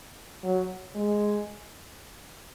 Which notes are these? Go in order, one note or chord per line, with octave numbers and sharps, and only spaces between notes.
F#3
G#3